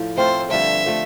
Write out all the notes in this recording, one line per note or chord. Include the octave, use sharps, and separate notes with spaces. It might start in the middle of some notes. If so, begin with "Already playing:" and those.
Already playing: A2 F3
A3 C4 F4 A4 C5
G2 D3 F3 A3 E5
F3 A3